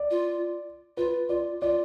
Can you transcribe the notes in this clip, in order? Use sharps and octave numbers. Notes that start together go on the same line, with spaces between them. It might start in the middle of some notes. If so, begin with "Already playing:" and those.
Already playing: D5
F4
F4 B4
F4 D5
F4 D5